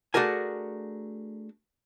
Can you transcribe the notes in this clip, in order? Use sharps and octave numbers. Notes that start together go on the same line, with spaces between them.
A3 D4 F#4 G#4 A#4 G#5